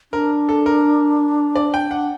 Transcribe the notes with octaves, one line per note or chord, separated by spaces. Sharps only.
D4 A#4
A4
A#4
D5
G5
F#5